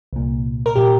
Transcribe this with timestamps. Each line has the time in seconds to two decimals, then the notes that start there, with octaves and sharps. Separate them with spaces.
0.13 C2 A#2
0.66 A#4
0.76 A#2 G4